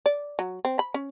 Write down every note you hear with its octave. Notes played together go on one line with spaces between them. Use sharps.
D5
F#3
C4
B5
C#4